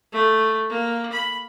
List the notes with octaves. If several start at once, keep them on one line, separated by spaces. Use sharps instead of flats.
A3
A#3
B5